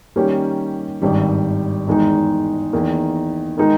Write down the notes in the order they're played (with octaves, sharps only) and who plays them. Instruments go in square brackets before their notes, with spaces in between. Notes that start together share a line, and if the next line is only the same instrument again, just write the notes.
[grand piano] D#3 G3 A#3 C#4 G4
G#1 G2 D#3 G3
E2 D#3 G#3 D#4
E2 D#3 A#3
D#3 G#3 D#4 A#4